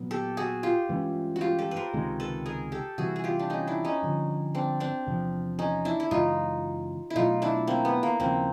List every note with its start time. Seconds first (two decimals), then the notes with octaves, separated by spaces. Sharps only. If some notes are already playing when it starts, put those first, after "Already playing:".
Already playing: A#2 F#3 B3
0.11 G4 A4
0.37 F#4 G#4
0.63 F4 G4
0.89 G2 E3 G#3 C#4
1.36 F#4
1.41 F4 G4
1.59 G4 A4
1.71 B4
1.76 A#4 C5
1.93 C#2 C3 D#3 G#3
2.20 A4 B4
2.46 G#4 A#4
2.72 G4 A4
2.98 C3 E3 G3 F#4 G#4
3.16 G#4
3.24 F4 G4
3.39 D4
3.50 C#4 D#4
3.67 D4 E4
3.85 C#4 D#4
4.02 G2 D3 F3
4.55 C4 D4
4.80 C4 D4
5.07 E2 C3 F3
5.59 C#4 D#4
5.85 D4 E4
6.00 E4
6.11 F#2 C#3 E3 G#3 D#4 F4
7.10 E4
7.16 B2 F#3 A3 D#4 F4
7.42 D4 E4
7.68 A#3 C4
7.85 B3
8.03 A#3
8.19 D#2 C#3 F3 A#3 C4